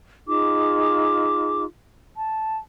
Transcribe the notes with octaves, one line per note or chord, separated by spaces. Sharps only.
D#4 F4 G#4 D6
A5